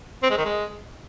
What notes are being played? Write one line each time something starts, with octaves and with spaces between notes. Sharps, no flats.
C4
G#3
D#3
G#3